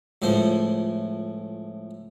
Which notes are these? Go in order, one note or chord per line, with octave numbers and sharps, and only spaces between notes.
C#2 A2 F3 C5